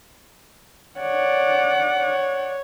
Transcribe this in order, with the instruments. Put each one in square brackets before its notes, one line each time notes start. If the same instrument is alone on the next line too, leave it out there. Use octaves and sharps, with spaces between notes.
[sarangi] C#5 [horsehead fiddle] D5 F#5
[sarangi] C#5